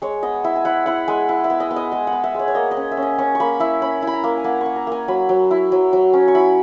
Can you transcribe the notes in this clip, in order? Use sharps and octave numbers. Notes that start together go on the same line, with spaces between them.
G#3 C#5
B3 D#5
E4 E5
G#5
E4 F#5
E4 F#5
G#3 G#5
E4
E5
B3
D#5
B3
D#5
G#3 D#5
F#5
B3
E5
G#3 C#5
C#5
A#3 D#5
D#5
C#4
E5
C#4
D#5
C#4 C#6
C#6
A#3 B5
E4 E5
C#4 B5
E4 B5
A#5
A#3
G#5
A#3 F#5
C#6
A#3
A#5
A#3 G#5
F#3 B5
F#3
E4
F#3
F#3
C#4
C#6
E4 B5